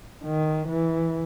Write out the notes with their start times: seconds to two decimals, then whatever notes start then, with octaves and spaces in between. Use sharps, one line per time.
0.25 D#3
0.68 E3